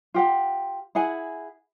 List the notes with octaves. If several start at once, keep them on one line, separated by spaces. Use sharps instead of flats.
F4 G4 F#5
E4 G#4 F#5 G#5